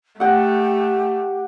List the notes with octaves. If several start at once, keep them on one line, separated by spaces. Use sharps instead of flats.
A3 G4 F#5 G5